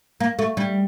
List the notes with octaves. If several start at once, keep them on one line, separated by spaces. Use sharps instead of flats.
A#3
A3
G3